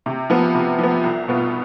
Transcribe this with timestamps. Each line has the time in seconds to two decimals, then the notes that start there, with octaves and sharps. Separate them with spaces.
0.06 C3
0.30 F3 B3
0.55 C3
0.79 F3 B3
1.03 C2
1.28 B2 B3 F4